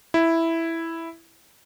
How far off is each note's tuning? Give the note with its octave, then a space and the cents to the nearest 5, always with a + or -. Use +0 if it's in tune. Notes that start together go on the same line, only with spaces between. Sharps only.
E4 +0